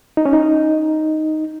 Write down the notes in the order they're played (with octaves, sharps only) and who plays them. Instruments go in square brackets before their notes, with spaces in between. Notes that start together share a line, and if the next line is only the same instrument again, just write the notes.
[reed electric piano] D#4
C#4
D#4